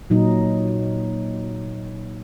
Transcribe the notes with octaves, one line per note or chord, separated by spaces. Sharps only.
A#2 F#3 D#4